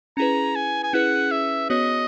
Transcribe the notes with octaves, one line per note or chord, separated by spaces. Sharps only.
C#4 E4 G#4 B4 A#5
G#5
G#5
C#4 E4 G#4 B4 F#5
E5
B3 F#4 C#5 D#5